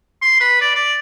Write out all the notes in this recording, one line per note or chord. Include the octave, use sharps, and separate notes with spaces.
C6
B4
D5
D5